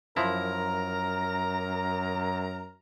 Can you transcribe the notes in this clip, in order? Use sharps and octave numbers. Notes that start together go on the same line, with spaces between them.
F#2 F3 E4 A#4 A#5